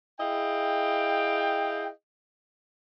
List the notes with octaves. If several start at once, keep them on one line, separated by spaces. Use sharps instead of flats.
E4 G#4 D#5 F5 G5